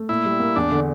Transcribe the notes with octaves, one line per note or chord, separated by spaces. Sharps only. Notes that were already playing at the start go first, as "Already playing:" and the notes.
Already playing: A3
A#2 E4
G3
A#3
E2 D4
D3